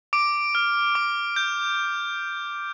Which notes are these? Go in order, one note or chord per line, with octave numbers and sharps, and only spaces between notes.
D6 D7
F6
D6
G6